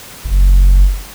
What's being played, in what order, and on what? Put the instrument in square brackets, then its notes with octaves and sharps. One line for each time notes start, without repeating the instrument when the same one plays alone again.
[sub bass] F#1